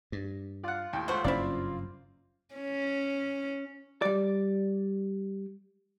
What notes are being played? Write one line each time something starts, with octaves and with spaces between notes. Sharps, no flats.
G2
F4 D5 F#5
D#2 A2 G5
C#2 A3 F#4 C5 C#6
F#1 G2 A#3 C4 C#4 E4 D5
C#4
G3 D5